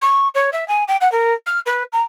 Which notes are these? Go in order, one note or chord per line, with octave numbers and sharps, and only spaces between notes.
C#6
C#5
E5
G#5
G5
F#5
A#4
F6
B4
A#5